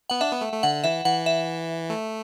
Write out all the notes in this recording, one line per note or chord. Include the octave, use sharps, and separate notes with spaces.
B3 F#5
D4 E5
B3
A3
A3
D3 F#5
E3 E5
E3 F#5
E5
A3